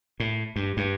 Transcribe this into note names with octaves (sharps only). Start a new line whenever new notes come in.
A2
G2
G2